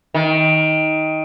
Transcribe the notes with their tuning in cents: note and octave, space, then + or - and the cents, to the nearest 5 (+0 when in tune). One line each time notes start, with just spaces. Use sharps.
D#3 +15